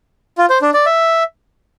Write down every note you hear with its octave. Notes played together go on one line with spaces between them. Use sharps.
F4
C5
D4
D5
E5